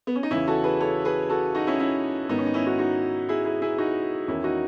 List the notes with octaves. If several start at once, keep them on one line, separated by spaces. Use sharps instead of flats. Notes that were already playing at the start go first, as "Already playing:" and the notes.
B3
C#4
D#4
E2 C#3 E3 C#4 E4
F#4 A4
G#4 B4
A4 C#5
G#4 B4
F#4 A4
D#4 F#4
C#4 E4
C#4 E4
G#2 D#3 B3 D#4
C#4
D#4
C#4 E4
D#4 F#4
D#4 F#4
E4 G#4
E4 G#4
E4 G#4
D#4 F#4
E2 D#3 C#4 E4
D#4 F#4